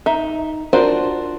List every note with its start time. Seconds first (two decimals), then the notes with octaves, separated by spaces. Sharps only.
0.06 D#4 E5
0.73 D4 F4 F#4 A#4 C5